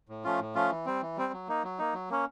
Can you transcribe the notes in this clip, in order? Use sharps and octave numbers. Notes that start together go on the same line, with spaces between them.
A2
F3 A3 C#4 F4
A2
F3 A3 C#4 F4
E3
G3 C4
E3
G3 C4
F#3
A#3 D#4
F#3
A#3 D#4
F#3
A#3 C#4